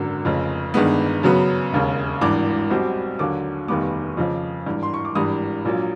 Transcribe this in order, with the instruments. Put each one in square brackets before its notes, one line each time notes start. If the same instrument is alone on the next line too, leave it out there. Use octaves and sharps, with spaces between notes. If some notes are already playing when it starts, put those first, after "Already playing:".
Already playing: [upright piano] G#1 F#2 D3
F1 F2 C#3
G1 G2 D#3 G#3 B3
F#2 C#3 F#3 B3
E1 D#2 C#3
G#1 G2 E3 D6
B1 B2 G3 C4
D#2 D3 F#3 D6
F1 D#2 D#3 G3 B3 D6
F2 C#3 F3
G#1 G2 E3
C6
C#6
D6
G#1 G2 E3 G3 D#6
A#1 A#2 F#3